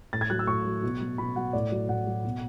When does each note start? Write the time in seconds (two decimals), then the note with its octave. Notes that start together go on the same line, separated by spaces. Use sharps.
0.13 A2 A6
0.21 G#6
0.30 F#3 F#6
0.39 E6
0.47 A2 C#6
0.65 F#3
0.83 B2
1.01 F#3
1.18 B2 B5
1.36 F#3 F#5
1.53 A2 D5
1.72 F#3
1.89 A2 F#5
2.07 F#3
2.25 B2